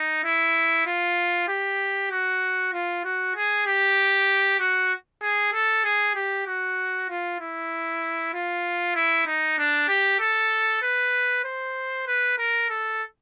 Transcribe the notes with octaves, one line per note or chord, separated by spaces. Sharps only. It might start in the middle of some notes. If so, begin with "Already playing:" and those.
Already playing: D#4
E4
F4
G4
F#4
F4
F#4
G#4
G4
F#4
G#4
A4
G#4
G4
F#4
F4
E4
F4
E4
D#4
D4
G4
A4
B4
C5
B4
A#4
A4